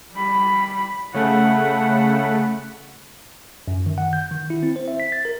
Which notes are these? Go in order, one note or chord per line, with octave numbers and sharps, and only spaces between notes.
G3 B5
C#3 A3 F#5 B5
F#2
D#3
F#5
G6
D#3
E4
C4
C5
E5
B6
A6
A#4